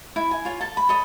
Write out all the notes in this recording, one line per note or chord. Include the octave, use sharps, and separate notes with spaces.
E4
G#5
F4 C#5
A4 A5
B5
A4 C#5 D#5 B5